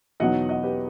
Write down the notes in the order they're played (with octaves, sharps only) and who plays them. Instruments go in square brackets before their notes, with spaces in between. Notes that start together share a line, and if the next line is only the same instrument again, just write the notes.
[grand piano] E2 B2 F#3 B3 D#4 D#5 F#5
D#5 F#5
G4 B4